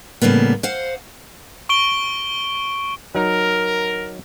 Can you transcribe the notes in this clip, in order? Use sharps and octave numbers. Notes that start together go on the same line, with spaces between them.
A2 C#3 G3 A#3 B3
C5 F5 F#5
C#6 D7 G7
F#3 D#4 A#4